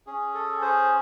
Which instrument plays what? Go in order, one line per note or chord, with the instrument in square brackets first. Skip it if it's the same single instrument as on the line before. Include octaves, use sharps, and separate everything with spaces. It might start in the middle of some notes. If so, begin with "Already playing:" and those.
[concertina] C#4 G#4
A4
G#4 C5